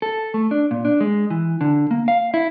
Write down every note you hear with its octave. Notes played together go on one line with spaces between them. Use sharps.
A4
A3
D4
A#2
D4
G#3
E3
D3
A#3
F5
E4